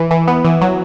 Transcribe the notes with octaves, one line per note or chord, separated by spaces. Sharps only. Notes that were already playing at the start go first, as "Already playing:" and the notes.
Already playing: E3
E3
B3
E3
F#3